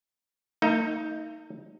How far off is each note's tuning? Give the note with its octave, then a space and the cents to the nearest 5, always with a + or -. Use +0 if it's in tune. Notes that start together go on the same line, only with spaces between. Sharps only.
A#3 -45 D#4 +15